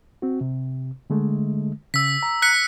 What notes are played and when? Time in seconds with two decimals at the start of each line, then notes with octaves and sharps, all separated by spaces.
0.22 C4 F#4
0.41 C3
1.10 D3 G#3 A3
1.94 C#3 E6 B6
2.23 A#5
2.42 F#6 B6 C#7